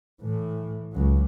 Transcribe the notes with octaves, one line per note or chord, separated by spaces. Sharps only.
A2 E3
C#2 F#3